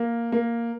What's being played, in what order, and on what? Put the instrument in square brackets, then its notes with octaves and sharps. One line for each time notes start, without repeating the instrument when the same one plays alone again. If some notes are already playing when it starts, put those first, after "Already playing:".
Already playing: [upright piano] A#3
A#3